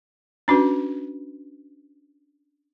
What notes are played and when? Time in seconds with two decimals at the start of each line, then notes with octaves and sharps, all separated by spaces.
0.48 C#4 D4 F#4 B4